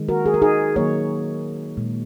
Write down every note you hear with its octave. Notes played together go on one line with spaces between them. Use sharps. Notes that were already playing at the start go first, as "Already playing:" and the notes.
Already playing: D#3 G#3
F#4 A#4
G#4
A#4
D#4 G#4
D#3 F#3 A#3 G#4 C#5
A#2 G#3